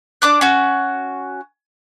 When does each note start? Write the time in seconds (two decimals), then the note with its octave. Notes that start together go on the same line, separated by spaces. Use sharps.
0.22 D4 D6 F#6
0.41 C#4 F#4